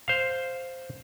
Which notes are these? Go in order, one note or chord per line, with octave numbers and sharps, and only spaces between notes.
C5 F5